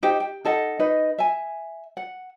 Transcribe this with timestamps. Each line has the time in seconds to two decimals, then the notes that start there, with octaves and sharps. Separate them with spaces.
0.03 D#4 G4 C5 G5
0.20 G5
0.45 D#4 A4 D#5 F#5
0.79 D#4 B4 D#5
1.18 E5 G#5
1.97 F#5